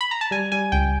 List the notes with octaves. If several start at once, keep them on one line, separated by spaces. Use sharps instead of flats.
B5
A#5
A5
G3 G#5
G3 G#5
C#2 G5